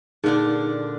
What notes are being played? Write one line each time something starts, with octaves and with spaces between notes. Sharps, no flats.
A#2 D3 D4 D#4 G#4